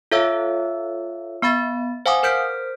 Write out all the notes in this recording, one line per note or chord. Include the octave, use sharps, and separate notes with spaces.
F4 A4 C#5 E5 F5 E6
B3 F5 B5 A6
C5 F5 F#5 G#5 D6 D#6
A#4 C5 F6 G6 B6 D7